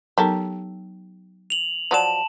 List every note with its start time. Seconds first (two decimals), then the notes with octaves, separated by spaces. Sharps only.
0.18 F#3 B3 D#4 G4 A4 A#4
1.50 F7 F#7
1.91 F3 F#3 D5 A5 E7